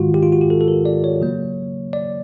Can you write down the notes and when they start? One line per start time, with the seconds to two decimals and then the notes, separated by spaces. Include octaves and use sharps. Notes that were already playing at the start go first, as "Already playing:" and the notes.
Already playing: G#2 D#3 G#3 F4 F#4
0.14 G4
0.23 F4
0.32 F#4
0.41 G4
0.50 A4
0.61 A4
0.68 A#4
0.85 D5
1.04 C#5
1.21 C#3 F#3 A#3
1.93 D5